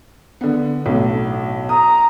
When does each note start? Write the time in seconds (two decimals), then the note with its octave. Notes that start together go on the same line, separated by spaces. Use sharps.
0.41 D3 B3
0.86 B1 A2
1.69 A#5 D#6